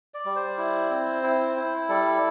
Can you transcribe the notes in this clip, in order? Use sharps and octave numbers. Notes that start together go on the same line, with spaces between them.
D5
G3
C5
E4
C4
E4
E4
G3 A4